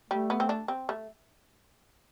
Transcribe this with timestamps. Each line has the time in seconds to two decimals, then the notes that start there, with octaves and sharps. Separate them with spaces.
0.10 G3 A3
0.30 B3
0.40 C4
0.49 D4
0.68 C4
0.89 A3